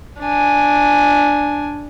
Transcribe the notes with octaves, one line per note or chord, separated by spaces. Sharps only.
D4 G#5